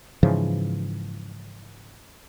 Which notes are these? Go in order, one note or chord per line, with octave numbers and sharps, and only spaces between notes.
G#2 C#3 E3 F3